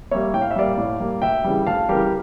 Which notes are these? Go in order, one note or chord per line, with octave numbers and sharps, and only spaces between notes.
G3 A#3 C#5 E5
A2 G5
F5
E5
G3 A#3 D5 F5
A2
G3 A#3
D2 E5 G5
C#3 E3 G3
D2 F5 A5
C#3 E3 G3 G4 A#4
G4